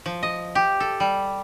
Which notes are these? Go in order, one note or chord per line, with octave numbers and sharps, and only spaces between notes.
F3
D#5
G4
A4
G3